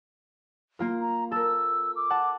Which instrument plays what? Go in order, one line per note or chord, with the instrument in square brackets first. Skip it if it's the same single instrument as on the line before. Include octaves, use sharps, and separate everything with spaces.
[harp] A#3 F4 A#4
[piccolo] A#5
[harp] A4 A#4 [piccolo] E6
[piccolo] D6
[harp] F#5 A5